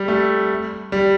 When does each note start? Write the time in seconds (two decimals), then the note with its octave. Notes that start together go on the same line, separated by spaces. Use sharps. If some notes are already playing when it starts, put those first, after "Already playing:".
Already playing: G3
0.08 A3
0.92 G3